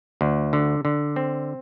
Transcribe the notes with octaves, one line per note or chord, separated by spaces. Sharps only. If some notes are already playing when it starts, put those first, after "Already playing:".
D2
D3
D3
C4